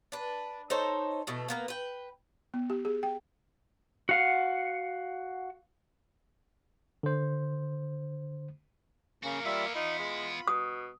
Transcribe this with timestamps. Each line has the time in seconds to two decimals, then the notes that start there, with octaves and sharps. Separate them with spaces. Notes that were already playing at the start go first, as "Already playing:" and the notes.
0.12 D4 B4
0.70 D#4 A4 C5 C#5
1.27 B2 E3 A3
1.48 A#3 B3 A#4
1.68 B4 G5
2.54 B3
2.70 G4
2.85 G#4
3.03 G5
4.09 F#4 F5 F#5
7.03 D3 C5
9.24 C#3 A#3 C#4 F#4 A#4
9.45 G3 B3 E4 F4 E5
9.75 D#4 F4 B5
9.99 G#3
10.48 B2 D#6